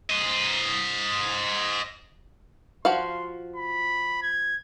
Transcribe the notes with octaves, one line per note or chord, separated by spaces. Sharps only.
C5 D#5
F3 F#4 F5 C6
B5
G#6